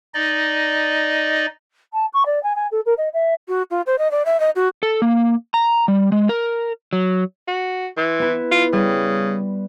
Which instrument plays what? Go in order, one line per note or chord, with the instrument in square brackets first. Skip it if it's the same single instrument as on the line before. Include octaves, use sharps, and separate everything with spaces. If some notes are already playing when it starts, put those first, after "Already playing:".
[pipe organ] D#4 D5 D#5
[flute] A5
C#6
D5
G#5
G#5
A4
A#4
D#5
E5
[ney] F#4
F4
C5
D#5
D5
E5
D#5
F#4
[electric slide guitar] A4
A#3
A#5
G3
G#3
A#4
F#3
[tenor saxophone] F#4
[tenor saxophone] E3 [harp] C6
[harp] B3 E4
[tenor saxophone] F4
[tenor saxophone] C#3 [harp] G3